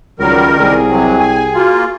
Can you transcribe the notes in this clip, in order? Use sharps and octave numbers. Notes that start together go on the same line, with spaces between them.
C#2 D#3 F#3 G3 A#4
C2 G#4
C3 F#3 G5
G#5
A#3 F4 F#4